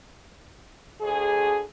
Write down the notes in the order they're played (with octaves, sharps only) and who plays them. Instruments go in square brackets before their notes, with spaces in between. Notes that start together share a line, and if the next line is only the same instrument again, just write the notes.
[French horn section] D2 G#4